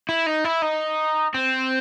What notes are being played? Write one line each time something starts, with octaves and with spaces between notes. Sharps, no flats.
E4
D#4
E4
D#4
C4